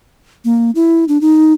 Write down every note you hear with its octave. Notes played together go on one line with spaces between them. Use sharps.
A#3
E4
D4
D#4